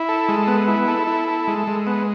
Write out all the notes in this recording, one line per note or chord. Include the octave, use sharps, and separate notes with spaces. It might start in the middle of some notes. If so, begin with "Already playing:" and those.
Already playing: E4
A4
G#3
B3
E4
A4
E4
A4
G#3
G#3
B3